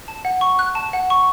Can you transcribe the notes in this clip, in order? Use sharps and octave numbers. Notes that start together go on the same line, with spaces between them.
A5
F#5
C#6
F#6
A5
F#5
C#6